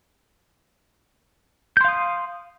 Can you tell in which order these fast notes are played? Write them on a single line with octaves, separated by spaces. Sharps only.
G6 C6 F5 D#6